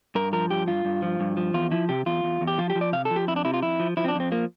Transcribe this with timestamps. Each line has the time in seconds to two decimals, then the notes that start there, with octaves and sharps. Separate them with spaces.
0.15 G2 A#4
0.33 F3 A#4
0.50 G2 G4
0.67 G2 F4
0.85 G2
1.02 F3
1.20 G2
1.37 F3
1.54 E2 F4
1.71 F3 E4
1.89 C3 G4
2.06 E2 F4
2.24 E2
2.41 E2
2.48 G4
2.58 F3 F4
2.70 G4
2.75 F3
2.81 D5
2.93 C3 F5
3.05 A4
3.11 F3
3.16 G4
3.28 F2 E4
3.36 D4
3.45 C3 E4
3.54 F4
3.62 F2 E4
3.80 F3
3.97 F3 E4
4.04 C4
4.08 D4
4.15 F2
4.20 C4
4.32 F3 A#3